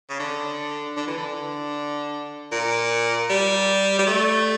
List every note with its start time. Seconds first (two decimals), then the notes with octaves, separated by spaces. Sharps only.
0.09 C#3
0.19 D3
0.96 D3
1.07 E3
1.17 D3
2.51 A#2
3.29 G3
3.98 G3
4.06 A3